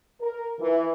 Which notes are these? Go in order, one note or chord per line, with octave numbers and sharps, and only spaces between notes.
A#4
E3